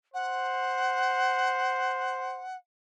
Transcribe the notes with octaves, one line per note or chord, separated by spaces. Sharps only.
C5 F#5